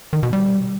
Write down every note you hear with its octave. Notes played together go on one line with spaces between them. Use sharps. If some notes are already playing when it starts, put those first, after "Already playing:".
D#3
B2
G3